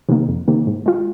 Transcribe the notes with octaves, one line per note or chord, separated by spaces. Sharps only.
C3 D#3 A#3
F2
C3 D#3 A#3
G#2
G#3 F4